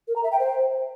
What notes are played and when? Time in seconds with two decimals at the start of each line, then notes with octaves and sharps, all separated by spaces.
0.08 A#4
0.16 A#5
0.24 E5
0.32 G5
0.40 C5